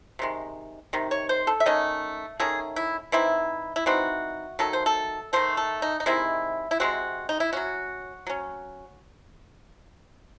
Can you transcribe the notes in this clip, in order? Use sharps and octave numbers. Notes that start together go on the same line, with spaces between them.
C3 D#3 G#3
C3 D#3
C#5
C5
A4
E5
D#3 A3 C#4 D#5
D#3 A3 C#4 G#4
E4
E3 C4 D#4 E4
E4
E3 C4 D#4 F#4
D#3 F#3 A3 A4
C5
A4
D#3 F#3 A3 C5
A4
D#4
D#4
C3 D#3 G#3 C4 E4
E4
C3 D#3 G#3 C4 F#4
D#4
E4
F#3 C#4 F#4
F#3 C#4